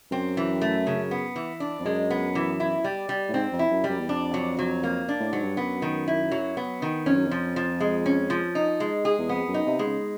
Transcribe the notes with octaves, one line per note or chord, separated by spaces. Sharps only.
F#2 C4
E3
A3
C#3
B3
E3
D4
F2
F#2 G#3
B3
E3
E4
G3
G3
A2
G#2 C4
F2
E4
F#2
G3
F#2
E2
F2 D4
F#3
F#3
A#3
D4
A2
G#2 F#3
G2
F#2 B3
D#3
E4
F#3
B3
D#3
F2 C#4
F#2
F2 F3
F3
G#3
C#4
F3
D#4
G#3
G#4
E2
F2 B3
F#2
D#4
C3
G#3
C#3